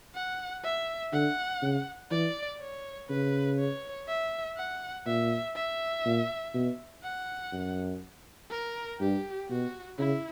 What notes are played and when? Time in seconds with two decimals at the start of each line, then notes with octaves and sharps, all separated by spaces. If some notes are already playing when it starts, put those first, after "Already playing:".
0.14 F#5
0.64 E5
1.13 D3 F#5
1.62 C#3
2.11 E3 D5
2.61 C#5
3.09 C#3 B4
3.59 C#5
4.08 E5
4.57 F#5
5.06 A#2 E5
5.55 E5
6.05 A#2
6.54 B2
7.03 F#5
7.52 F#2
8.50 A#4
9.00 G2 G4
9.49 B2 F#4
9.98 C#3 E4